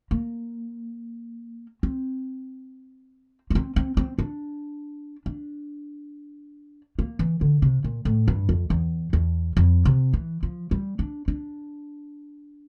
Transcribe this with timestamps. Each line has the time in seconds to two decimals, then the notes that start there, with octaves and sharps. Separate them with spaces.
0.11 A#3
1.83 C4
3.50 A#3
3.55 C4
3.76 C4
3.97 C4
4.18 D4
5.26 D4
6.99 A#3
7.19 E3
7.41 D3
7.62 C3
7.84 A#2
8.05 A2
8.28 G2
8.49 F2
8.70 E2
9.13 E2
9.57 F2
9.85 C3
10.13 E3
10.43 F3
10.71 G3
10.99 D4
11.28 D4